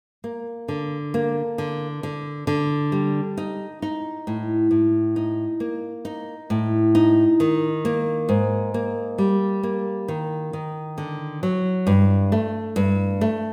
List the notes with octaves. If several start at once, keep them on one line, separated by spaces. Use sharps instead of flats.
A#3
D3
A#3
D3
D3
D3
G3
D#4
D#4
A2
A2
D#4
A#3
D#4
A2
D#4
D#3
A#3
G#2
A#3
G3
A#3
D#3
D#3
D3
F#3
G2
A3
G2
A3